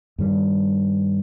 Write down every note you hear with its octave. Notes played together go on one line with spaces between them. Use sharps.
G2 D#3 G3